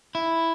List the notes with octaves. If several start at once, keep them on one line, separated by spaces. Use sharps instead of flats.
E4